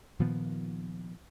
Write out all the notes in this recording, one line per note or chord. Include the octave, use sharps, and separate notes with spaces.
A#2 D#3 F3 B3